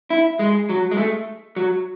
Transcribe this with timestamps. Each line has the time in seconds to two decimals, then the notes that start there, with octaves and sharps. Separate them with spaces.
0.10 E4
0.39 G#3
0.69 F#3
0.91 G#3
0.97 A3
1.56 F#3